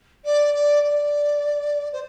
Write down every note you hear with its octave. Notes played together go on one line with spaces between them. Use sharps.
D5
D5
D5
C5